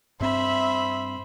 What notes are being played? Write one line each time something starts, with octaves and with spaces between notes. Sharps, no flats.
G2 C4 C5 E5 B5